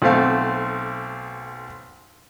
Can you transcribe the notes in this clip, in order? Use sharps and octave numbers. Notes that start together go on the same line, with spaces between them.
B1 A3 C4 F5